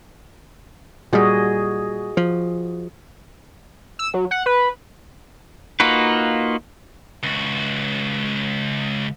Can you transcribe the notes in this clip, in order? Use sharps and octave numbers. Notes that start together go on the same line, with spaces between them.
A#2 G3 F#4 G#4 D#5
F3
E6
F#3
F#5
B4
A#3 D#4 F4 F#4 B4
C#2 F#4